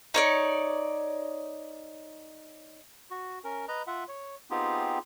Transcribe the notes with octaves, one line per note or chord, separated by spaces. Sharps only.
D#4 C#5 D5
F#4
C#4 A#4
B4 D#5 A#5
F4 E5 F#5
C#5
B3 C4 D#4 F4 G4 G#4